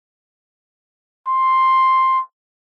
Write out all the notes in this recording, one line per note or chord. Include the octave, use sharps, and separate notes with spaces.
C6